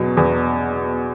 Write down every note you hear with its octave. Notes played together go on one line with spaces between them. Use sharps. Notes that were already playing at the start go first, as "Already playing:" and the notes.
Already playing: E2 B2 F#3
E2